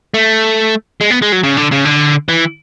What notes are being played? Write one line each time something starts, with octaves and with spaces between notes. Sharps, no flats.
A3
G#3
B3
G#3
F#3
C#3
D3
C#3
D3
E3